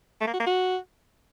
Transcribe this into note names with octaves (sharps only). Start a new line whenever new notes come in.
A3
A#3
F#4
A#3
F#4